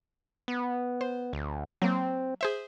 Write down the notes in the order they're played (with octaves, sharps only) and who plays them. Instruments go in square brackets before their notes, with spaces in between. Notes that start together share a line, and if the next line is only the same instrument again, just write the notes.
[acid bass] B3
[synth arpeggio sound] C5
[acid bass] D2
[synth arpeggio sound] F#3 A#3 [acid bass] C4
[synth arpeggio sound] G#4 C5 E5